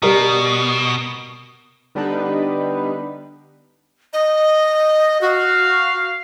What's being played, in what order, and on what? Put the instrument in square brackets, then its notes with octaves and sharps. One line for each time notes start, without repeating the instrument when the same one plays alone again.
[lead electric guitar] B2 [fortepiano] G3 A#4 A#5
[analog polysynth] D3 G3 B3 D4 D#4 B4
[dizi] D#5
[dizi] F#4 [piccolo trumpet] F5